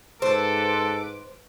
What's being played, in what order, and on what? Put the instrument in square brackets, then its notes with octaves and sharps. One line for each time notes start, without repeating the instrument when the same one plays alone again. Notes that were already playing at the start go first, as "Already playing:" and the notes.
[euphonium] G#2 [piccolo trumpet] A4 [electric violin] B4 D6 [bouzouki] C5